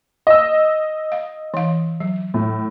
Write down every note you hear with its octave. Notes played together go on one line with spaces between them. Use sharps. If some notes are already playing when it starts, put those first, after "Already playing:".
D#5 E6
F5
E3 F5
F#3
A2